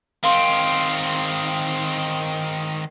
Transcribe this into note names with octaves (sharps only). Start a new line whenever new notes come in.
D#3 C4 F5 C6